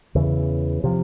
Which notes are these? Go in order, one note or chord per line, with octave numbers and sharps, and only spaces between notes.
E2 C#3 E3
C3 F3